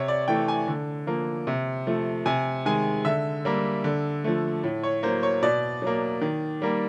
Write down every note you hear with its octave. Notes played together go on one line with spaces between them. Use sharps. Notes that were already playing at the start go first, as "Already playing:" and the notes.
Already playing: C3 C#5
D5
E3 A3 G5
G#5
D3
F3 A#3
C3
F3 A3
C3 G#5
D#3 G#3 G#5
D3 E5
G3 A#3
D3
F3 A3
A2
C#5
F#3 A#3 C5
C#5
B2 D5
F#3 A#3
D#3
G3 A#3